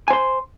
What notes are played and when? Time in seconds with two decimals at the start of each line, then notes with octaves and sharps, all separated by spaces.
0.08 G#5
0.10 C5
0.13 C6